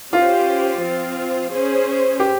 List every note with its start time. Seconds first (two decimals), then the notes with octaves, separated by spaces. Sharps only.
0.12 C#4 F4 G4 C5
0.81 F3 C4 F4
1.50 C#4 G#4 C5
2.20 G4